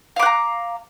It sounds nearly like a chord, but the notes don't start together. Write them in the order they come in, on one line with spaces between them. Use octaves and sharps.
F5 D6 F#5 A#5